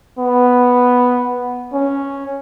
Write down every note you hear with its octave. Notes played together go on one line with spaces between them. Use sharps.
B3
C#4